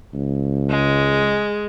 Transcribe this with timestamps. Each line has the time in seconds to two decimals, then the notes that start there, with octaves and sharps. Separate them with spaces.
0.14 C#2
0.70 G#3